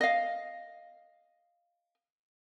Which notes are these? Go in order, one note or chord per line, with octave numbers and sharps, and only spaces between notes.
D#5 F5